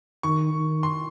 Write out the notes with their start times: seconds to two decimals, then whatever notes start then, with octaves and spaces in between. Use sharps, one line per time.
0.23 D#3 C#6
0.54 D#3
0.83 C6